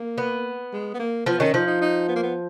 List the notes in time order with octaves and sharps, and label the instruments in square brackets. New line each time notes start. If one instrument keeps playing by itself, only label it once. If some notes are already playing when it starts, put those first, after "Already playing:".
Already playing: [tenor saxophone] A#3
[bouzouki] B3
[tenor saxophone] G#3
B3
A#3
[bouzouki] F3 [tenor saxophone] B3
[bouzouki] D#3 [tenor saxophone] C#4
[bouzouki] F3 [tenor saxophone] D#4
[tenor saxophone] D#4
D#4
B3
A#3
B3